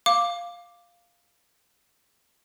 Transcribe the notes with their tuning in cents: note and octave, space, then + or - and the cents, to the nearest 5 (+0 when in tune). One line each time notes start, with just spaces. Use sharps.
F5 +0 D6 +0